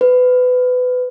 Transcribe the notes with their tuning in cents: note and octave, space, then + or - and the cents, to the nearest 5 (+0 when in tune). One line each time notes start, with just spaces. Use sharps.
B4 +25